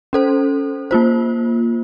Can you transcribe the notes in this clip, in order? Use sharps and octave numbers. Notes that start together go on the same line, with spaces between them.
C#4 A4 C5
A#3 F4 C5